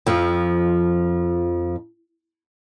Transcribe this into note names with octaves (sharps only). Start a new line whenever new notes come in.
F2 F3